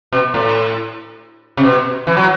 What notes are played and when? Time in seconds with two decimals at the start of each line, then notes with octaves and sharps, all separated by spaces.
0.12 B2
0.34 A2
1.57 C3
1.63 B2
2.07 E3
2.17 F#3